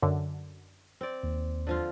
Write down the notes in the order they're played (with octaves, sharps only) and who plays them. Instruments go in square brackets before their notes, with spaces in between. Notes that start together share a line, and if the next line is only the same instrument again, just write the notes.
[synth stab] F#2 D3
[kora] C4 D5
[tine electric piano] D#2
[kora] D3 F3 F4